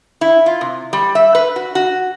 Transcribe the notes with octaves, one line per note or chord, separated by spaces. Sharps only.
E4
F4
C3
G3
E5
B4
F#4
F#4